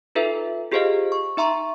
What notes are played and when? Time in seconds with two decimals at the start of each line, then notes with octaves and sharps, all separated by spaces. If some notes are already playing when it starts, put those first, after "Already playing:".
0.15 D#4 F4 A4 B4 E5
0.71 F4 G4 G#4 C5 D#5 F5
1.12 C#6
1.37 D#4 E5 A#5 C6 C#6